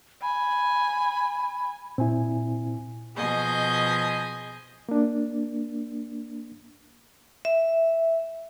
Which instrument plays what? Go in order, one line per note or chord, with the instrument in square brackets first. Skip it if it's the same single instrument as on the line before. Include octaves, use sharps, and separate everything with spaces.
[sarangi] G#5 [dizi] B5
[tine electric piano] A#2 G#5 [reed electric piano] C4 E4
[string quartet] B2 F3 G#4 D#5 G#5 G6
[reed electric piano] A#3 D4
[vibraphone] E5